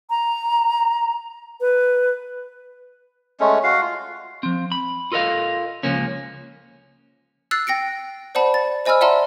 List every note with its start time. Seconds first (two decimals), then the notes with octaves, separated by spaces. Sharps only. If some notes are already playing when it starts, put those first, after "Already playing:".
0.10 A#5
1.61 B4
3.40 G#3 A3 C#4
3.64 F#4 F5
3.82 F4
4.43 F3 C4
4.72 B5
5.12 F4 A4 A#4 D#5 F5
5.83 C#2 C#3 F3 A#3 C#4
7.51 E6 F#6 A6 C7
7.67 G5 A#6 C#7 D7
8.35 C5 D5 F#5 A5 B5
8.54 A6
8.86 C5 D#5 G#5 B5 E6 F6
9.01 D5 E5 F#5 A5 A#5 C6